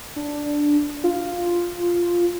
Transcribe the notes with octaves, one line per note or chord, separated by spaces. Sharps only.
D4
F4